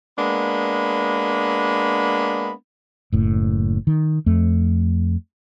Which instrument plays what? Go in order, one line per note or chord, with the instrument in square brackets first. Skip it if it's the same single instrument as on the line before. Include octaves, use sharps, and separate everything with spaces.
[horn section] G#3 A#3 B3 D4 B5
[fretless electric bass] F#1 A2
D#3
F2 A3